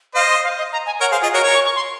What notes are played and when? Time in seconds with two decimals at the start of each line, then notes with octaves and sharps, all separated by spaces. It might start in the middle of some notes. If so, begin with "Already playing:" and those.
0.15 C5 D#5 F5
0.30 C6
0.44 F5
0.58 D#5
0.72 A#5
0.86 G#5
1.00 A#4 C#5 F#5
1.11 G#4 C5 F5
1.23 F4 G#4 D#5
1.33 F#4 A#4 C#5
1.44 A#4 C#5
1.55 C#6
1.65 C#6
1.76 C6